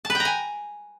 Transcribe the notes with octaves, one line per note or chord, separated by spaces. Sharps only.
A5
B4
G5
A#5
G#5